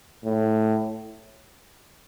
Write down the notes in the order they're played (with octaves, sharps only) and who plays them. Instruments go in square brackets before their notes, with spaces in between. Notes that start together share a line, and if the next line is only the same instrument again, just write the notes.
[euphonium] A2